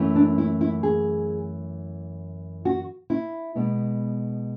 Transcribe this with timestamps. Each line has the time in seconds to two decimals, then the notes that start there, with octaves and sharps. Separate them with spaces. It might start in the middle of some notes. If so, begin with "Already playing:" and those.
Already playing: F#2 E3 A3
0.15 D4
0.38 E4
0.61 E4
0.83 G#4
2.65 F#4
3.10 E4
3.55 B2 G#3 B3